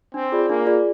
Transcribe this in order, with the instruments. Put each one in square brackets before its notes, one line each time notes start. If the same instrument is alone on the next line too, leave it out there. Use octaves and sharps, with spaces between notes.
[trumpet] C4 [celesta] D4
[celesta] F4 G#4 D5
[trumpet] A#3 [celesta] D4
[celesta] F4 G#4 D5